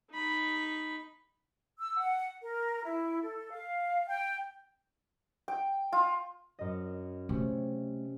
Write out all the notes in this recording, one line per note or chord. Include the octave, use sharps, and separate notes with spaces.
D#4 B5
E6
F#5
A#4
E4
A4
F5
G5
G5
F4
F#2 D#5
C3 A3 C#4